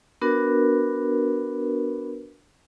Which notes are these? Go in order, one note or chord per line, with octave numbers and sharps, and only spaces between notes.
B3 D4 F#4 A#4 B4